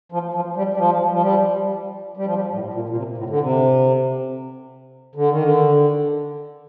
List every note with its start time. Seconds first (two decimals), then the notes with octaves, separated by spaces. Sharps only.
0.12 F3
0.34 F3
0.56 G3
0.74 G3
0.77 F3
1.12 F3
1.22 G3
2.17 G3
2.26 F3
2.35 G3
2.53 A2
2.74 A#2
2.89 A#2
2.96 C3
3.18 A2
3.30 D3
3.40 C3
5.15 D3
5.29 D#3
5.43 D3